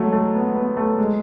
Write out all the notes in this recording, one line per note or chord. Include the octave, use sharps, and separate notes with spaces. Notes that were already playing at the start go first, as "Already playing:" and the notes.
Already playing: F#3 G#3 A3
A3
B3
B3
A3
G#3